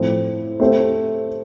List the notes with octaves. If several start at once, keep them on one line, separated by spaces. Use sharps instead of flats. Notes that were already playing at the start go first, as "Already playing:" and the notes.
Already playing: A2 F3 C4
A3 C4 G4 C5